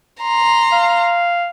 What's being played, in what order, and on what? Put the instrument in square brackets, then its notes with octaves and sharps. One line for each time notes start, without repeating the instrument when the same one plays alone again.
[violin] A#5 C6
[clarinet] F5